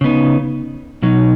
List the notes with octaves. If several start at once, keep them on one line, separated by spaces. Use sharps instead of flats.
C#3 B3 D#4
B2 F#3 D#4